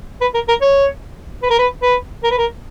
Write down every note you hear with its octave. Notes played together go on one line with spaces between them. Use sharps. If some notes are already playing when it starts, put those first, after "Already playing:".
B4
A#4
A#4
C#5
B4
A#4
B4
B4
A#4
B4
A#4